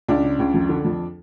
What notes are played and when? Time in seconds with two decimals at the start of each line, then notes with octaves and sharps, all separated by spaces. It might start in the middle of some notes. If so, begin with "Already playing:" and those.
0.08 C#2 D4
0.23 C#3
0.39 C#2
0.54 F2
0.69 D3
0.85 F2